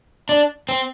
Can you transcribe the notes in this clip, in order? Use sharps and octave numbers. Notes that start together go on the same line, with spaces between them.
D4
C4